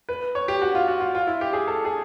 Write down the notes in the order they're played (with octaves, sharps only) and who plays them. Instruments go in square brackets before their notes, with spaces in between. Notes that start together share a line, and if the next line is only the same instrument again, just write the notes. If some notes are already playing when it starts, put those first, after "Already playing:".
[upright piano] B4
C#5
G4
F#4
F4
F#4
F4
F4
E4
G4
G#4
A4
G#4